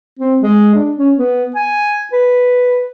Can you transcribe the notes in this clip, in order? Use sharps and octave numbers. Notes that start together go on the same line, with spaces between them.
C4
G#3
D4
C#4
B3
G#5
B4